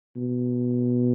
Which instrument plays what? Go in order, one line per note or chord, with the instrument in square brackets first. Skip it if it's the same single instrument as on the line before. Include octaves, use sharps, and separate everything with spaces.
[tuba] B2